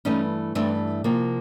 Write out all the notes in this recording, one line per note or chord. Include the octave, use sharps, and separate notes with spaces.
G2 E3 A3 C#4 D#4
G2 E3 A3 C4 D4
C3 F3 A#3